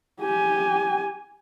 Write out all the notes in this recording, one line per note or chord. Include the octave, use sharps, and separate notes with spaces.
G4 G#5